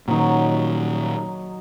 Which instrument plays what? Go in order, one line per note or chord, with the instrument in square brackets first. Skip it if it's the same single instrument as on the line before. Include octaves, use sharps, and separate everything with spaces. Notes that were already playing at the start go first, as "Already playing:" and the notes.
[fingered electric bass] A#2 D#3 [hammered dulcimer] F#3 D#4